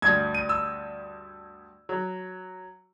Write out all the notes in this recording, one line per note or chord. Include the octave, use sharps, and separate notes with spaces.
D2 G2 G#6
D#7
E6
F#3